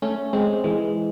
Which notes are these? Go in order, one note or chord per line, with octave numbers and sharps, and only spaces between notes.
A3 C#4
G#3 C4
E3 G#3